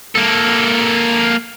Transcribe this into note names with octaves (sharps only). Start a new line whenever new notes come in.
A#3 A4